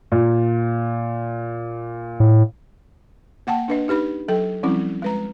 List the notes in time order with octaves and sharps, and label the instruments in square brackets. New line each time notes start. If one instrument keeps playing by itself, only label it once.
[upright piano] A#2
[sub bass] A2
[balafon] A#3 F#5 G5 A5
D4 B4 D#5
D#4 G4 B4 B5
F#3 A4 G5
F3 G3 C4 C#4 E4
G#3 B4 A#5